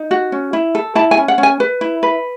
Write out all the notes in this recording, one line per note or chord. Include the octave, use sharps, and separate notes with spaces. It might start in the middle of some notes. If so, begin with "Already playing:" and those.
Already playing: D#4
F#4
C#4
E4
A4
E4 A5
G#5
C#4
F#5
C#4
G#5
B4
E4
B4